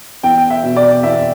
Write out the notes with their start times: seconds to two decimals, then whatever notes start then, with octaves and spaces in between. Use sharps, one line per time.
0.23 E2 G5
0.50 E5
0.63 B2
0.76 D5
1.03 E2 E5